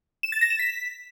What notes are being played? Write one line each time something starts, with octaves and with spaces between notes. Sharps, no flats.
E7
A6
A#6
E7
B6